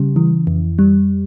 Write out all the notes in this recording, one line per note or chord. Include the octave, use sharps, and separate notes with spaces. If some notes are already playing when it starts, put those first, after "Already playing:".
Already playing: C#3 G3
E3
F2
G3